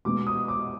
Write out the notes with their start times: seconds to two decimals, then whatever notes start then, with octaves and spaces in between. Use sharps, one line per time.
0.05 B2 G#3 B3 D6
0.27 D#6
0.48 D6